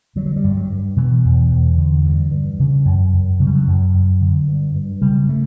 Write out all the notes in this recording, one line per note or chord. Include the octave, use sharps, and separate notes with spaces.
D3 F#3
F#3
G3
G2
F#3
G2
B2 E3
E2
E2
D3
G2
G2
C#3
F#2
F#2
C#3 F#3
G3
F#3
F#2
F#2
D3
G2
G2
C#3 G3
A3